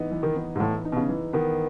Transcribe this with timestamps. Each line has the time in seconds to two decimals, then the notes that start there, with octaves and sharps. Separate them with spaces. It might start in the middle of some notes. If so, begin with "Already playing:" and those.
Already playing: E3 B3 D#4
0.11 E3
0.23 D#3
0.36 B3
0.56 G#2
0.60 A2 E3
0.85 D#4
0.92 B2
0.97 C#3
1.09 E3
1.33 D#3 B3